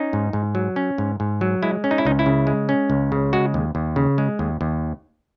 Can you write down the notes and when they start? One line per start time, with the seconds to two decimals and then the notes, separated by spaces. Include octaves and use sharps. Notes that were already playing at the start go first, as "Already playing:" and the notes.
Already playing: C#4 D#4
0.13 G#2
0.33 G#2
0.55 F#3
0.76 C#4
0.98 G#2
1.20 G#2
1.41 F#3
1.63 G#3 E4
1.84 C#4
1.91 D#4
1.98 E4
2.05 C#2 D#4
2.19 E4
2.26 C#3
2.47 G#3
2.69 C#4
2.90 C#2
3.12 C#3
3.33 G#3 F#4
3.54 D#2
3.75 D#2
3.96 C#3
4.18 G#3
4.39 D#2
4.61 D#2